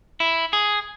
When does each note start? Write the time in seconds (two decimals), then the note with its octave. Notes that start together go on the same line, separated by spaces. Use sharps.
0.20 E4
0.53 G#4